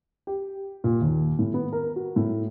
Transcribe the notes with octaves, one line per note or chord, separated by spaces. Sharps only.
G4
A#2
D#2
A2
B3
A#4
F#4
A2